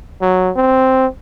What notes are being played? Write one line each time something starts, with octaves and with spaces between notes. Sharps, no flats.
F#3
C4